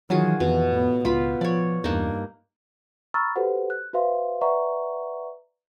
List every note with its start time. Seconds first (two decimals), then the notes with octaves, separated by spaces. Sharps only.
0.10 D#3 E3 F#3 F4 F#4 G#4
0.40 F2 B2 E3
0.71 A2 B3
1.05 C#2 B3 F4 B5
1.41 F3 C#5 D5
1.84 E2 G2 A#3 D4 D#4
3.14 A#5 B5 C#6 E6 F6 A6
3.36 F#4 G4 A4 B4 C5 F#5
3.70 F#6
3.93 F#4 B4 C5 E5 F5 C6
4.41 B4 D5 E5 F#5 A#5 C#6